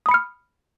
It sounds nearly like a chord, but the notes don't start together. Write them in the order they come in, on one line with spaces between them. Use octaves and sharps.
D#6 B5 C#7 F6